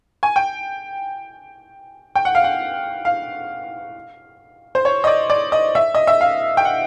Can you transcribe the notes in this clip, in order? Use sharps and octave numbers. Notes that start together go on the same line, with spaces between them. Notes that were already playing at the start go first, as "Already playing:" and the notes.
G#5
G5
G5
F#5
F5
F#5
F5
C5
C#5
D#5
D5
D5
D#5
E5
D#5
E5
F5
G5
F#5